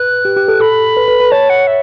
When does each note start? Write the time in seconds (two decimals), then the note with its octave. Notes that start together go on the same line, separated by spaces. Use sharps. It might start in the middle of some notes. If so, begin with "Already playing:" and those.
Already playing: B4 F#6
0.25 G4
0.36 G4
0.48 A4
0.60 A4 B5
0.97 B4
1.08 B4
1.20 B4
1.31 C#5 A5
1.50 F#5
1.67 E5